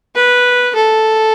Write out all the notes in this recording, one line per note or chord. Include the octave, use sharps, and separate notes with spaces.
B4
A4